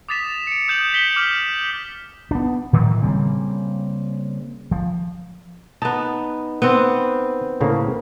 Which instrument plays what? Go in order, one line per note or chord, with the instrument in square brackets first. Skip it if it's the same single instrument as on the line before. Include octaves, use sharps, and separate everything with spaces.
[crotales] D6 D#6 A6 B6 E7
C#7 D7
D#6 G6 E7 F#7
B6 C#7 F#7 G7
D6 F6 E7 F#7
[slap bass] B3 D4
A2 D#3 E3 F#3
C#3 G3 A#3 C4
F3
[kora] B3 D#4 [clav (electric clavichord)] A5
[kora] B3 C4
[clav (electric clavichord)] A2 C#3 A#3